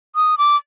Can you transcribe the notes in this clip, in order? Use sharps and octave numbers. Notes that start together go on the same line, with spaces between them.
D#6
D6